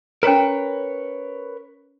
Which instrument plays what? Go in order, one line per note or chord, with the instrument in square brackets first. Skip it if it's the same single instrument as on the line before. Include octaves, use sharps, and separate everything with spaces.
[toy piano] C#4 A#5 [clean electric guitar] A#4 B4 C#5